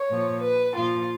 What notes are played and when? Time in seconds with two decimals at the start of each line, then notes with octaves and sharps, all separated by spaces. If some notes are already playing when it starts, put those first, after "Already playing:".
Already playing: C#5
0.10 A#2 F3
0.43 B4
0.75 A#2 F3 F4